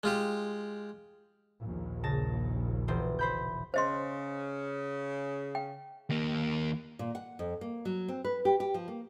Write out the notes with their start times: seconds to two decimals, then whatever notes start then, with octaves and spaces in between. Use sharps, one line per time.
0.03 G#3 F4 G4
1.61 A#1 D#2
2.04 C#3 A5 A#6
2.88 E1 B2 C5
3.19 C5 B5 G6
3.74 C#3 C5 D#5 C6
5.55 G5
6.10 D#2 A#3
6.99 A#2
7.15 F#5
7.39 F2
7.61 A#3
7.85 F#3
8.08 C4
8.25 B4
8.45 G4
8.60 G4
8.74 F3
8.88 A#3